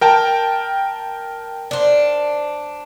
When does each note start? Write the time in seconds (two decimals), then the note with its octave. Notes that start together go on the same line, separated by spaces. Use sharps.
0.01 A#4 G5 A5
1.71 D4 C5